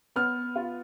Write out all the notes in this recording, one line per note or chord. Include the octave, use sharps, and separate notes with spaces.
B3 F6
F4